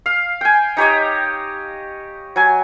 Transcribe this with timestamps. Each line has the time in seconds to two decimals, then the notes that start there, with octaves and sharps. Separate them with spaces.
0.06 F5
0.41 G5 G#5
0.77 D#4 G4 C#5 D#5
2.36 F#3 G#5